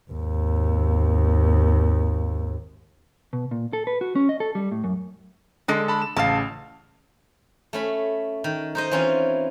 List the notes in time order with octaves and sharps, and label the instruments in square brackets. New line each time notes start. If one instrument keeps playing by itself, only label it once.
[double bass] G#1 D#2
[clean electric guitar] B2
A#2
A4
B4
F#4
C#4
D#5
A4
G3
A2
F#2
[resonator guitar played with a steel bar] D3 G#3 A4
[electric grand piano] A5 B5
E7
[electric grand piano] A1 C#3 F6 [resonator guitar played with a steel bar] F5 A5
[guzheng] A3 C#4 B5
D#3
D#4 C5 D#5
E3 C4 C#4 D#4 F4